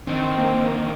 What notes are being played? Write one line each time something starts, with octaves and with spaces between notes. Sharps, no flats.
D3 D#3 C4
A#3